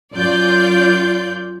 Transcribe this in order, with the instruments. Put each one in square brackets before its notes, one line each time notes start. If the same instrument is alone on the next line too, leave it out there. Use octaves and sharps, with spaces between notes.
[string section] F#2 F4 D5 G6